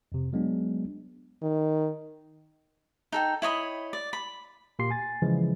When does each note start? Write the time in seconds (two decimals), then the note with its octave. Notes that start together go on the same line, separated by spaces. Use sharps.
0.12 F2 C3
0.33 F#3 G#3 B3 D4
1.42 D#3
3.12 D#4 A4 G5
3.42 E4 C#5 D#5 B5
3.93 D5
4.13 B5
4.79 A#2 A#3 G4 C6 C7
4.91 G#5 A6
5.22 C#3 E3 F3 G#3